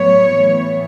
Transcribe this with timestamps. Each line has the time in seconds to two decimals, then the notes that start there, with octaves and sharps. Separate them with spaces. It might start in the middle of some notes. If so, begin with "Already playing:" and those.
Already playing: A2 F#3 B3 C#5
0.38 A2 E3 B3